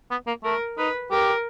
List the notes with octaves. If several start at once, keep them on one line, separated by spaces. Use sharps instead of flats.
B3
A#3
A3 A#4
D#4 B4
G4 A#4